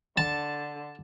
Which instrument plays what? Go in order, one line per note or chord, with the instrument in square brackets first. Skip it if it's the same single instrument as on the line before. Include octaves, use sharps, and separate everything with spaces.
[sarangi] D3 [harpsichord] A5